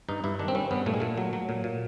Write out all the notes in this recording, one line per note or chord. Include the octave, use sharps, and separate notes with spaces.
G2 D#4
G2 E4
D#3 D4
C4
G3 C#4
G2 B3
A#2 A3
G#3
A#2 A3
F#3
F#3
A#2
A#2